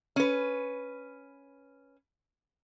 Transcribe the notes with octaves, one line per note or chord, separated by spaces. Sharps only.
C#4 B4